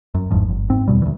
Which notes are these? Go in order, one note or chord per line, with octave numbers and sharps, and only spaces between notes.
F#2
G1 E2 G#2 F3
G1
G#2 C4
E2 B2 G3
D2 E3